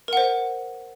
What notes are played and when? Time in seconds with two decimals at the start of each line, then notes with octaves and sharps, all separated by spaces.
0.08 A#4
0.13 F#5
0.17 C5